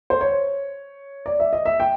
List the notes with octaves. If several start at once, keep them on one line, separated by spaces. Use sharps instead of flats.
C5
C#5
D5
E5
D#5
E5
G5